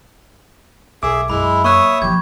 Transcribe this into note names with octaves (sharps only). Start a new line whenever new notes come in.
B1 G#4 E5 D6
F#2 G#3 E4 B5
A#3 C#5 E5 C#6 D#6 F#6
E3 F3 G4 G#6